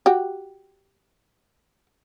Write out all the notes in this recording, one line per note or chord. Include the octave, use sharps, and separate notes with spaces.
F#4 G4